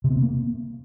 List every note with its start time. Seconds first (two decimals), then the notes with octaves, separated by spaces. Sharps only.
0.04 C3
0.10 C4
0.16 B3
0.22 A#3